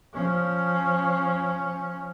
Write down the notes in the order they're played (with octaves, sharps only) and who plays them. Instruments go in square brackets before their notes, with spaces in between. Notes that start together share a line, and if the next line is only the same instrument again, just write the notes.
[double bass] F3 C#4